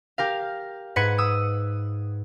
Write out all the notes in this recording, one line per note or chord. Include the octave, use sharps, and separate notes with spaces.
G4 A#4 F5
G#2 B4 F#5 G#6 C#7 D#7
D#6 E6